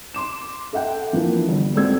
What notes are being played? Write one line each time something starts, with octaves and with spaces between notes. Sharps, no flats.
C6 D6 E7
A4 E5 F#5 G5
E3 F3 A#3 D4
G1
G#1 C4 A4 D5 E6 G#6